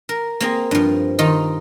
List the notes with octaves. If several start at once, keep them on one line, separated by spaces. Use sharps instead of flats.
A#4
A#3 C4 G#4
G2 F3
D#3 D#4 F4